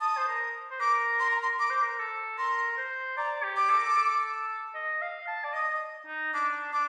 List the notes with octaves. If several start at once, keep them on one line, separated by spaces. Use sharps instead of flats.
A5 D#6
C5
A#4
C5
A#4 D6
C6
A#5
C6
A#4 D6
C5
A#4
A4
A#4 C6
C5
D5 A#5
G4
D6
A4
A#4
A4
A4
D#5
F5
A5
D5
D#5 D#6
D#4
D4 D6
D4 D6